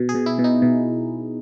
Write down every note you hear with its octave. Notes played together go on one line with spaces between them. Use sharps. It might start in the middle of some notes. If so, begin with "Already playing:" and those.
Already playing: B2
G#4
B2
E4
B2
D#4
B2